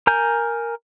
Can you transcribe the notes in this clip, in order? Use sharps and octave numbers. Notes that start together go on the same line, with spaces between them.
A#4 G#5 G6